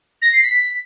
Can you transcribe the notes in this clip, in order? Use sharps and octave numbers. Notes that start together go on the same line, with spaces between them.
A#6
C7
B6